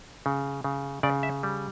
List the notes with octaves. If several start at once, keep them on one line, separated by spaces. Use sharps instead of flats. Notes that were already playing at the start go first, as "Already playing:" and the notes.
C#3
C#3
C#3 D5
E5
G3